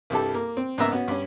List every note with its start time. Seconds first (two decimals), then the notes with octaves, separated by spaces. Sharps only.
0.10 C2 G2 G3 A4
0.34 A#3
0.57 C4
0.78 G#2 C#3 A#3 B3 E5 A#5
0.92 B3 C#4 F#4
1.08 G2 C#4